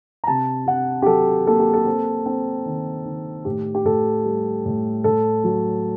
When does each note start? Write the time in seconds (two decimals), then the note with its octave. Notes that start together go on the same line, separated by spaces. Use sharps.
0.24 A#5
0.27 C3 A5
0.66 C3 F#5
1.02 G4
1.06 F#3 A4
1.46 A#3 A4
1.60 G4
1.74 A4
1.86 C4
2.26 C4
2.66 D#3
3.05 D#3
3.45 A2 G4
3.75 G4
3.85 A2 A4
4.25 G3
4.66 A2
5.04 A2 A4
5.44 F#3